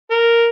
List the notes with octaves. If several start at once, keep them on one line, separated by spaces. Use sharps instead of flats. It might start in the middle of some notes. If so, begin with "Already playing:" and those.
A#4